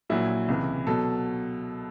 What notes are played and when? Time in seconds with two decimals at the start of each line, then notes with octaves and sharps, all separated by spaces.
0.10 A#1 A#2 F#3 E4
0.48 C#2 C3 E3
0.87 B2 F#3 A4